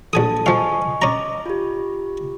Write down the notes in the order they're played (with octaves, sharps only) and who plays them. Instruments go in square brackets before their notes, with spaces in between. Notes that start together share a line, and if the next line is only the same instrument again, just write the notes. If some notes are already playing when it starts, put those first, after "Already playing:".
[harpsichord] A#1 G#5 D#6 [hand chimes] A4 A5
[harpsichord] F3 F5 [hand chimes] D#5 G#5 C#6
[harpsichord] C#4 A#5 [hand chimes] D#5 D6
[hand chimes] F4 G4